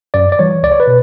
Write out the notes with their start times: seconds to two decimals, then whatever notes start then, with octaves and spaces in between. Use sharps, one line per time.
0.14 F#2 D5
0.32 D5
0.39 E3 G3 C#5
0.63 C#2 D5
0.72 C#5
0.80 B4
0.87 B2